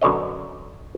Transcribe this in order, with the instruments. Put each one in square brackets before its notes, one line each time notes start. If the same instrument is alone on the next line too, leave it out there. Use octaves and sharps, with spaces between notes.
[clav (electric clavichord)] F#2 B2 D3 C#5 D#5